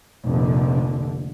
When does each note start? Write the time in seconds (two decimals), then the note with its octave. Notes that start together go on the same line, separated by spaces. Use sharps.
0.25 F1 A#1 D3